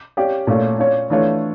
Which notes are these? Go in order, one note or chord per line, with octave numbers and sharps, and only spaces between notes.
C#4 G4 D5 F5
A#2 A3 C#4 F4
C#4 F4 C#5
E3 A3 D4 F4 C#5